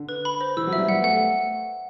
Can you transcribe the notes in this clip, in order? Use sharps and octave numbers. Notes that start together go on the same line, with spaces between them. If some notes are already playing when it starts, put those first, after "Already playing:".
Already playing: D3
B4
B5
C5
E3 E6
F#3
G3 E5
B3 F#5
A3 F#5